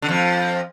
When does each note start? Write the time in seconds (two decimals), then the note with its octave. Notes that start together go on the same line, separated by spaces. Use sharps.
0.02 D3
0.09 F2 F3